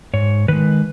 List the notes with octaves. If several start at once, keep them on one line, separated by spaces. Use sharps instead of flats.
G#2 C#5
D#3 G#3 B4